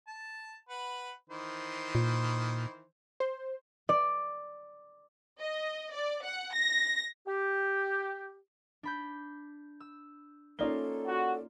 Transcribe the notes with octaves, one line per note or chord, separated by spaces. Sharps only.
A5
B4 F#5
D#3 E3 C5
A#2
C5
D5
D#5
D5
F#5
A#6
G4
D4 B5 G6
E6
A#3 C#4 D#4 F4 A4 D5 G7
F#4